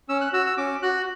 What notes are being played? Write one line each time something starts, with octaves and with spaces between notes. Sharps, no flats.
C#4 E6
F#6
F#4 E6
E6
C#4 D6
F#4 F#6